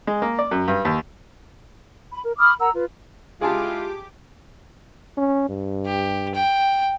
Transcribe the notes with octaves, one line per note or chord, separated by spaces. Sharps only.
G#3
A#3
D5
F#2
G2
D#2
B5
A#4
B5 D6 D#6 F6
A#4 F#5 A#5 E6
F4 B4
G#3 E4 F4 G4 G#4 G#5 A5 D6
C#4
G2
G4
G5